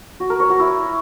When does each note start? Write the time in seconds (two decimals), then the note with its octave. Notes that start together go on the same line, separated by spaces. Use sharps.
0.20 F#4
0.30 A#4
0.40 C#5
0.50 F#4
0.59 E4